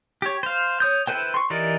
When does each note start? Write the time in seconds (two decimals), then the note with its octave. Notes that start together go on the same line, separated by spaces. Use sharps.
0.22 G4 C#5
0.43 C5 F5
0.80 C#5 D#6 G6
1.07 E4 A4 B4 C5 G5
1.34 C6 C#6
1.50 E3 D#4 G4 A#4 D5